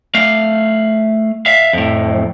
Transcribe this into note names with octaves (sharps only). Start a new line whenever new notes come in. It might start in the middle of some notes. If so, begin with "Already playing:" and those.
A3 F5
E5 F5
F2 A2